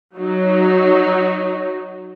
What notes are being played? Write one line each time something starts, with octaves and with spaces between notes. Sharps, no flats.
F#3 D#4